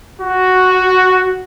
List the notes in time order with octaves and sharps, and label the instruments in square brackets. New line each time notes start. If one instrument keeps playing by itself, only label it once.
[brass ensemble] F#4